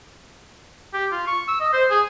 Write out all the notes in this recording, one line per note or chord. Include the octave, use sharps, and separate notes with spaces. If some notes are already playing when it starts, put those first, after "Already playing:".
G4
F4
C#6
E6
D#5
C5
G#4